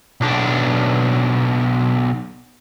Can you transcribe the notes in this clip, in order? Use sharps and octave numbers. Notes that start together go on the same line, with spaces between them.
B1 D4